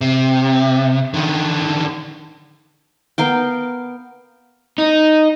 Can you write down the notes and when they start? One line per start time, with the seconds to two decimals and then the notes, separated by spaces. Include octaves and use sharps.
0.01 C3
1.14 D3 D#3
3.18 B3 A#4 F5 G5
4.78 D#4